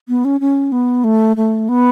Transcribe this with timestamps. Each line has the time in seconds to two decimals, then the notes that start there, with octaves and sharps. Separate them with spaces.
0.09 B3
0.25 C#4
0.40 C#4
0.72 B3
1.04 A3
1.36 A3
1.69 B3